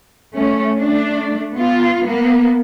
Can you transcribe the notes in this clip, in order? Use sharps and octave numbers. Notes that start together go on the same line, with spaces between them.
A3 C#4
A3 D4
B3 F4
A#3 B3